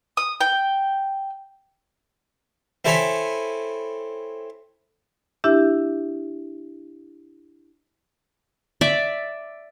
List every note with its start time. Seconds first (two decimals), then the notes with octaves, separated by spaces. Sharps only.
0.17 D#6
0.41 G5
2.85 C4 E4 A4 C#5 G#5 B5
5.44 D4 E4 G4 E5
8.81 D5 E5